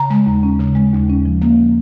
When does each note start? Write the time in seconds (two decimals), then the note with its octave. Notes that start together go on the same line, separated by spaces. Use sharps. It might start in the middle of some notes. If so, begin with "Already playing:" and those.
Already playing: C#3 A#5
0.10 G#3
0.26 D#2
0.43 C#4
0.60 C#3
0.75 G#3
0.93 D#2
1.09 C#4
1.25 F3
1.42 A#3